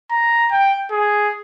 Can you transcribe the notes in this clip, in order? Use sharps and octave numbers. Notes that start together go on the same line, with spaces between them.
A#5
G5
G#4